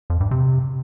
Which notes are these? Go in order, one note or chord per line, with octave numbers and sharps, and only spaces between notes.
F2
G2
C3